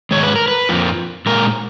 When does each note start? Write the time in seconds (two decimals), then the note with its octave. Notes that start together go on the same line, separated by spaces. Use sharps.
0.11 G#2 D#3 G#3 C#5
0.23 B4
0.36 A#4
0.48 B4
0.69 F2 F3 A#3
1.26 A#2 G#3 A#4